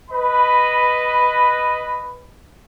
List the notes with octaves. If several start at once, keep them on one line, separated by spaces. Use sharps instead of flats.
B4 D#5 B5